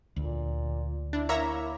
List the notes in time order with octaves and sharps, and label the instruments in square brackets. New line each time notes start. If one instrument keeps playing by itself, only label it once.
[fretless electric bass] D2 [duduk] A#2
[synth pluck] D4 [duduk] E4
[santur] A#3 [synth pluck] C#5 E5 A#5